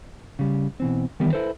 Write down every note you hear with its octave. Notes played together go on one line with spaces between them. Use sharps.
C#3 G3
B2 E3 C4
D#3 E3 G3 B3
E4 A4 B4 C5